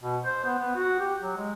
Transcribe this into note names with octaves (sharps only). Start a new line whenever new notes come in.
B2
C5
B3
B3
F#4
G4
F#3
G#3